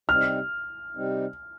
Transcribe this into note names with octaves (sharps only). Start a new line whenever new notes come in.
C3 G3 C4 D#4 F6
C3 G3 C4 D#4